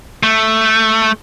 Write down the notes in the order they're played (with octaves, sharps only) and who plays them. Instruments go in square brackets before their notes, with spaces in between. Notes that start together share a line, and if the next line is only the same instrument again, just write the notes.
[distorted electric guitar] A3